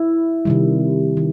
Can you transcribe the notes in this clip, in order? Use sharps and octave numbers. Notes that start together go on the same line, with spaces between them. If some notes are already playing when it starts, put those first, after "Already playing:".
Already playing: E4
C3 D#3 G3
D#3